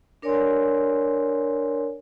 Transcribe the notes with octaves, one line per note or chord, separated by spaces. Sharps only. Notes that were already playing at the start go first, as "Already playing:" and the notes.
D4 A#4 C#5 D5 G#5 C6